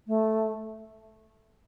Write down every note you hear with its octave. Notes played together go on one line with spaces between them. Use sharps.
A3